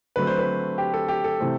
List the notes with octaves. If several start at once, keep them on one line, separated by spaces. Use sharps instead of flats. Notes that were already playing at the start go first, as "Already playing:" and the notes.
D3 F#3 A3 C4 B4
C5
B4
G4
A4
G4
A4
C3 E3 A3 C4